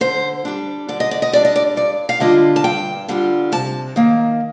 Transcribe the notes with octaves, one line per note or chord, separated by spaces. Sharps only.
D3 C5
G3 D4
D3 D5
D#5
D5
D#5
G3 D4 D5
D#5
D5
G2 D5
F5
D3 G3 D4 F4 D#5
A5
G2 G5
D3 G3 D4 F4
C3 A5
D#3 A#3